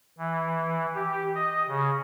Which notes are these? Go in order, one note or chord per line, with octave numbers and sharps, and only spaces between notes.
E3
G4
D#5
C#3